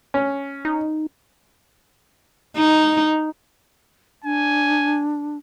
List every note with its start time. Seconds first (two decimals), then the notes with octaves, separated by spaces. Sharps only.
0.14 C#4
0.65 D#4
2.57 D#4
4.25 D4 G#5